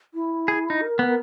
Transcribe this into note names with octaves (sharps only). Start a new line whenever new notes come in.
E4
G#4
D#4
A#4
B3